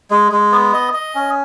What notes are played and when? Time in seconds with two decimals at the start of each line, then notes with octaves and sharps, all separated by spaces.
0.11 G#3
0.32 G#3
0.52 B3
0.73 D#5
0.93 D#5
1.15 C#4